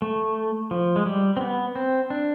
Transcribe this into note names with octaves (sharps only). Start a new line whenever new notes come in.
A3
F3
G#3
G3
C4
B3
C4
D4